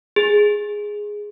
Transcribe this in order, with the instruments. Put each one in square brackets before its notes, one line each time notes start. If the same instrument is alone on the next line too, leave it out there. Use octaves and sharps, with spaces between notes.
[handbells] G#4